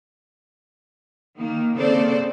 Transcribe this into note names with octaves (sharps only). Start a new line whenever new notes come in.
D#3 A#3
C#3 A#3 C4 A4 C5 D5